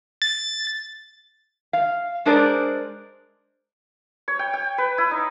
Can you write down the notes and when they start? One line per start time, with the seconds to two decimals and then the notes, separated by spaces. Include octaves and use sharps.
0.22 A6
1.73 F5
2.25 G#3 D4 G#4 A#4 C5 D5
4.28 C#5
4.39 G5
4.54 G5
4.78 B4
4.98 E4
5.11 D#4